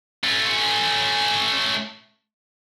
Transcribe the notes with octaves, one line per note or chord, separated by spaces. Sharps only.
A3 C#4